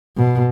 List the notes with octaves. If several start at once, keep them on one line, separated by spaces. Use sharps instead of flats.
B2